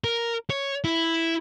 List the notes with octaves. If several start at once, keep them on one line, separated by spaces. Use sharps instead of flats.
A#4
C#5
E4